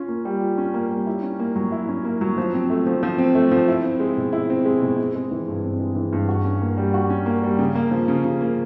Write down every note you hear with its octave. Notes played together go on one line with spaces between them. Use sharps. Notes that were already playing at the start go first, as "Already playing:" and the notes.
Already playing: C#4 F4
A#3
G3
F4
C#4
A#3
G3
E4
C#4
A#3
F#3
E4
C#4
A#3
F#3
F3
C4
A3
F3
F3
C4
A3
F3
E4
C4
G#3
B2
E4
C4
G#3
B2
C4
G#3
E3
G2
C4
G#3
E3
G2
F#4
C#4
A#3
G3
F#4
C#4
A#3
G3
C#3
A#3
F3
C#3
C#3
A#3